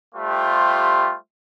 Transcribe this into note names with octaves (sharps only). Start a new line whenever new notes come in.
G3 A3 F4 G4 C5